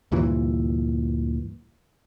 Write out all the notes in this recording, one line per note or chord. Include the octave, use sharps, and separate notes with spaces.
D2 G2 A#2 E3